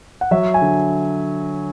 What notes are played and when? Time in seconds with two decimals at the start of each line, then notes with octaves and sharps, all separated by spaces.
0.21 F#5
0.31 F#3 E5
0.54 G#5
0.62 D3